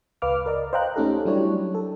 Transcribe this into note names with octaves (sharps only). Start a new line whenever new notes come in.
C#2 B4 F5 D6 F6
A#4 D5 D#5
C5 D#5 F5 G5 A#5 F#6
A3 C#4 D#4 G4 A4
F#3 G3 D4 E4 G4 C#5
A4